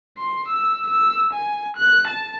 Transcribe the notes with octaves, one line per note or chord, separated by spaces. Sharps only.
C6
E6
E6
G#5
F#6
A5